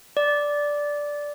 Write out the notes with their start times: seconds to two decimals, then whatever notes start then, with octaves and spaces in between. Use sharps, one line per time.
0.17 D5